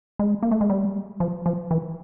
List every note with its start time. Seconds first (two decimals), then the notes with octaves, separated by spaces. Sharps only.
0.19 G#3
0.43 A#3
0.51 A3
0.61 G#3
0.70 G3
1.20 F3
1.46 F3
1.71 E3